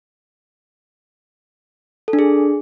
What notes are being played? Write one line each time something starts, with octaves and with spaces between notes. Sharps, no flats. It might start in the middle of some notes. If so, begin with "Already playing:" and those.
A4
D4
G#4